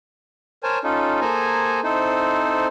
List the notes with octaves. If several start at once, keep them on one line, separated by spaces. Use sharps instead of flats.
A#4 C5 C#5 G#5 A5
C#4 D#4 F4 A4
A#3 G#4 A4 C5 G#5 A#5
C4 D#4 E4 A4 C5